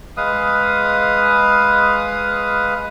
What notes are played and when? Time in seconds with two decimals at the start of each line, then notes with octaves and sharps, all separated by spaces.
0.17 G#3 B4 F5 D#6